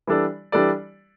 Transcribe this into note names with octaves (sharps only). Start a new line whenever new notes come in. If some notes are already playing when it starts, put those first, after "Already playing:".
E3 G3 D4 A4 D5
E3 G3 D4 A4 D5